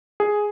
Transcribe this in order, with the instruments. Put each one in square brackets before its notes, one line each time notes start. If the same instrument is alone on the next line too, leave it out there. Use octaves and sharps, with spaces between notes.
[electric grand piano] G#4